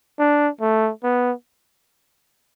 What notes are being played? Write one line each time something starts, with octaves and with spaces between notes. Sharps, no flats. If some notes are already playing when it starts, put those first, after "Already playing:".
D4
A3
B3